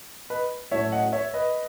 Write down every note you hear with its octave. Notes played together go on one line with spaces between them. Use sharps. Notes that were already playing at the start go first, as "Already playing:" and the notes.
B4 D#5
A2 F#3 A3 C#4 C#5 E5
D#5 F#5
C#5 E5
B4 D#5